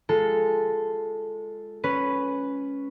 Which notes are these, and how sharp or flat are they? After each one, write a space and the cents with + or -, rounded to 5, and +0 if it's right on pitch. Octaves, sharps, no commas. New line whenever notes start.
G#3 +0 F4 +0 A4 +0
C#4 +0 B4 +0